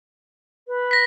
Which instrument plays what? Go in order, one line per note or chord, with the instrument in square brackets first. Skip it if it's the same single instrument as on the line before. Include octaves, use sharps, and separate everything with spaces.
[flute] B4
[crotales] A#6 B6